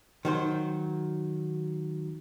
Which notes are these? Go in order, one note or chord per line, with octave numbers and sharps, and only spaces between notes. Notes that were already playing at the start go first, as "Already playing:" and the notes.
D#3 F#3 C5